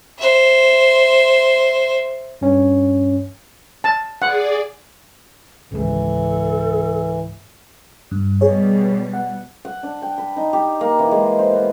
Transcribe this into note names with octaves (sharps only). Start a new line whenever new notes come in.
C5 E5
G2 C#4 C#5
A5
G#4 D5 F#5
G#1 C#2 G#2 E3 A4
G2
B2 G3 G#4 C#5
F#5
F#5
D4
G5
B5
D#4
G4
A#3
E3
G#3
C5
B3